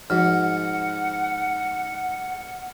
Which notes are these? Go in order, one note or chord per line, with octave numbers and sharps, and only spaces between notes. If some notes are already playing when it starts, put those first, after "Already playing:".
G#2 F3 F#4 F#5 F6